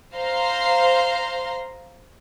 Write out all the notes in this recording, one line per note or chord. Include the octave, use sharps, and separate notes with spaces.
C5 F5 A#5 C6